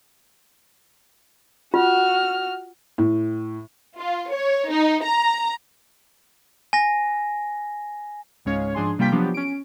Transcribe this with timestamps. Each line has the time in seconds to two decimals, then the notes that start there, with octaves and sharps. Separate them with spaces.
1.74 F4 F#4 F6
2.98 A2
3.99 F4
4.33 C#5
4.70 D#4
5.04 A#5
6.73 G#5 A#6
8.45 C#2 G#2 G#3 C#4 C#5 F5
8.74 G#2 F3 D4 G#4 G#5 C6
8.98 C3 G3 A#3 F4 G5 B6
9.12 F3 F#3 B3 D4 F4 G4
9.34 C#4 D7